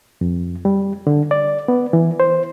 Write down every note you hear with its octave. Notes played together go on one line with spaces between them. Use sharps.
F2
G3
D3
D5
B3
E3
C5